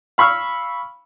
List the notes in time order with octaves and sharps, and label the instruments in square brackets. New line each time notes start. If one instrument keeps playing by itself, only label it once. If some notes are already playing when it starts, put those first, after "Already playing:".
[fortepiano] F5 B5 C#6 E6 F6